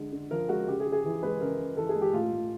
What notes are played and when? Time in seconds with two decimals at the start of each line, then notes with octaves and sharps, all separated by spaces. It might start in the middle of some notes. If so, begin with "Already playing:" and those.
Already playing: D3 G#3
0.12 D3
0.31 F3 A#4
0.49 G#3 F#4
0.67 C#3 G4
0.80 G#4
0.85 C#3
0.92 G#4
1.04 E3
1.23 G#3 B4
1.40 C#3 A#4
1.59 C#3
1.77 E3 A4
1.89 G#4
1.95 G#3
2.01 G4
2.13 A2 F4
2.32 A2